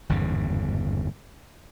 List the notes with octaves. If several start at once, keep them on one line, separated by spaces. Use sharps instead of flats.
G1 E2 G#2 C#3